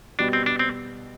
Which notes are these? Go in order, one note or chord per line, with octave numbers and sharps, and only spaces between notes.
B2 G3 B3 D4 F#4
C4
D4
C4